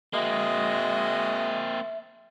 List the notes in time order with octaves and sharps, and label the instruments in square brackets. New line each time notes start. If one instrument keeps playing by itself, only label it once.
[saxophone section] G#3 F#4 D#5 [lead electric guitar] A#3 C4 [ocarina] E5